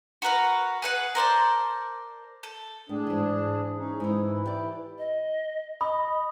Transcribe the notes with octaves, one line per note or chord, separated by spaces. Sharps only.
F#4 A#4 B4 A#5
G#4 B4 F#5
A#4 C5 D5 A5
A4
A2 D4 G#4
G#2 E3
C#4 D#4 G#4
G#2 E3 D#4 E4
G4 D5
D#5
D#5 B5 D#6